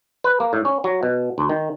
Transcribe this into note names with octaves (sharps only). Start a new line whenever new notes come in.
B4
A#3
A2
C#4
F#3
B2
D2
D#3